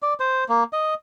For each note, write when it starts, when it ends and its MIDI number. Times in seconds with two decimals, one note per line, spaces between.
0.02 0.14 74
0.20 0.44 72
0.49 0.64 58
0.73 0.94 75